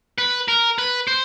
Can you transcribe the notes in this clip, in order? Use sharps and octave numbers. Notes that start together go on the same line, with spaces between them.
B4
A#4
B4
C5